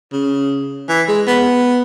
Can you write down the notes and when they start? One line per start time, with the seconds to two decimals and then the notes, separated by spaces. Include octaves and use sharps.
0.13 C#3
0.89 E3
1.08 G#3
1.27 B3